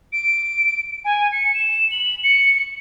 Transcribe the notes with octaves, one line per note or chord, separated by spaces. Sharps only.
D7
G#5
C#7
E7
F#7
C#7